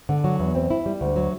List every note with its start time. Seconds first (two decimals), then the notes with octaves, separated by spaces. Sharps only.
0.09 D3
0.24 F#3
0.39 E2
0.55 C4
0.70 E4
0.86 G3
1.01 D2
1.16 F#3